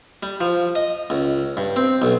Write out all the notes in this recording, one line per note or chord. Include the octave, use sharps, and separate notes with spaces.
G3
F3
D#5
C#2
G2
C4
B1